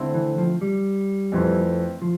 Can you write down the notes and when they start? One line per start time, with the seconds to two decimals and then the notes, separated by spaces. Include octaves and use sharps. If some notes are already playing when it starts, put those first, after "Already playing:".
Already playing: D3 A3 C4 E4
0.14 E3
0.38 F3
0.61 G3
1.32 F2 E3 A3 C4 E4
2.02 F3